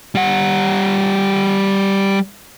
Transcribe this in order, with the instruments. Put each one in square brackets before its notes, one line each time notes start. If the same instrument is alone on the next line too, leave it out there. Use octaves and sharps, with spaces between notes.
[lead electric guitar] G3 F#5